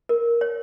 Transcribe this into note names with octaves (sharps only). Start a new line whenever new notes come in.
A#4
C#5